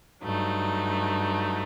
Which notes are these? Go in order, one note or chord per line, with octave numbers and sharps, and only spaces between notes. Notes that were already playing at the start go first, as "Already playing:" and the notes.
G2 F#3 A3 D#4